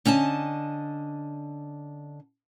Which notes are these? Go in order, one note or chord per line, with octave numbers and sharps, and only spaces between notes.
D3 C#4 D#5 A5